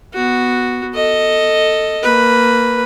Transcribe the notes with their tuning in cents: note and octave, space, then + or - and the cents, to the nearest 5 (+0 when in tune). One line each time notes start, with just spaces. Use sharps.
B3 +0 F#4 +0
A4 +15 D#5 +0
A#3 -10 B4 +0